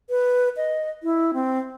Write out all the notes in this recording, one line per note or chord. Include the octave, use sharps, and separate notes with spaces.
B4
D#5
E4
C4